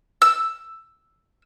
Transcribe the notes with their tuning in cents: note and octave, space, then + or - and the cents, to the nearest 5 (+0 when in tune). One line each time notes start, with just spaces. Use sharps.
E6 +5